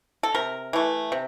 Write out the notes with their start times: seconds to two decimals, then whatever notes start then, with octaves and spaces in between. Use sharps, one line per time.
0.23 A4
0.35 C3 A#4
0.73 E3 A3
1.12 C3